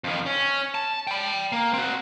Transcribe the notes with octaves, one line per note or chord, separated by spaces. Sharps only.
F2 D#3
C#4
A5
G5 B5
A#3
C4 F#4